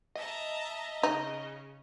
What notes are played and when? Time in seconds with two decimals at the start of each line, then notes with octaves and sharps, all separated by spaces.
0.15 D#5 E5 A5 A#5
1.03 C#3 D#4